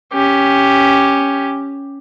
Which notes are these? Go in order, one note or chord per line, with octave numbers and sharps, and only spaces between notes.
C#4 G4